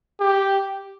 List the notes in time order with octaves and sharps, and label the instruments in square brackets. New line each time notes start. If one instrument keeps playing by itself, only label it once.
[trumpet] G4